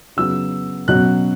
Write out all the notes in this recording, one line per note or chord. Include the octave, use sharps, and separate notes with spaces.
C#3 F#3 B3 E6
B2 F#3 C#4 F#6